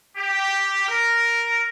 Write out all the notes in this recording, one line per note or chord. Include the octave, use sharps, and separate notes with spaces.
G4
A#4